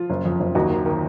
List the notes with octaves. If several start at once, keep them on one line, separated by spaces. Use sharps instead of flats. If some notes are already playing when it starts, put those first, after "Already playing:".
Already playing: F3 F4
F#1
F2
F#1
D#2 D#4 F#4
D#3
D#3